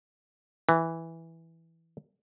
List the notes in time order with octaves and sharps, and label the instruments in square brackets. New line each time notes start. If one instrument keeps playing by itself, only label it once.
[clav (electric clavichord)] E3